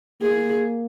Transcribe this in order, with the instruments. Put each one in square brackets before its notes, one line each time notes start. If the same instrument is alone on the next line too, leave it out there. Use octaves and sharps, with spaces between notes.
[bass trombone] A#3 [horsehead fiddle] G#4